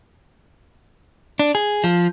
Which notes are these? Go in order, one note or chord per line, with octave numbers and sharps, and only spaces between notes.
D4
G#4
F3